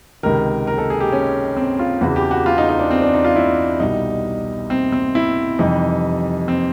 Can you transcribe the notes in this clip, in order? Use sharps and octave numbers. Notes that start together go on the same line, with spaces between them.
C#2 C3 D#3 A#4
A#4
A4
G#4
G4
C#4
C4
F4
E2 C#3 E3 F#4
G4
F#4
F4
D#4
D#4
D4
C4
D4
D#4
F4
E4
C2 B2 G3 D#4
C4
C4
E4
F2 C3 E3 G3 D#4
C4